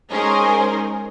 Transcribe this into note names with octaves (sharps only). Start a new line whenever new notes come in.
G#3 C#4 D#4 G#4 A#4 C5